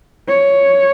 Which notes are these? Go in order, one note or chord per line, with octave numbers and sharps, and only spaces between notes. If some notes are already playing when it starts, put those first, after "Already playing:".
C#5